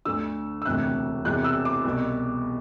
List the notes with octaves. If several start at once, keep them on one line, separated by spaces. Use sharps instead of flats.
D2 D3 E6
E6
E1 D2 C3 F#6
E1 E2 C3 F#6
E6
D6
C2 B2